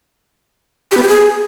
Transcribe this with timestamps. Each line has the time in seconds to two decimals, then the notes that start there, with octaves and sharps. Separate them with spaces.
0.91 G4
0.97 B3
1.03 G4
1.08 G#4